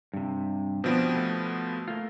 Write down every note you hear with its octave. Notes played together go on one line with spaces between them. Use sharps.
G2 C3
B2 F3 B3 C4 D4 G4
A3
A3 A#3 F4